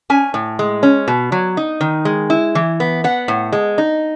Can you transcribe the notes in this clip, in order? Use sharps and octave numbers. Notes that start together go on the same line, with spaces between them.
C#4 G#5
A2
G#3
C#4
B2
F#3
D#4
D#3
G#3
E4
E3
B3
B3 F#5
A2
G#3
D#4